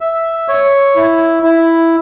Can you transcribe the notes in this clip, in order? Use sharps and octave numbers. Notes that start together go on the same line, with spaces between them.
E5
C#5
E4
E4